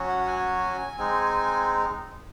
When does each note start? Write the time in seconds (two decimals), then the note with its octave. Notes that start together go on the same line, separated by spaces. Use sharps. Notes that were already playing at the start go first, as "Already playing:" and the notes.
Already playing: F#3 C#4 F#4
0.09 F#5
0.21 F#5
0.27 G#5
0.98 G#3 C4 D#4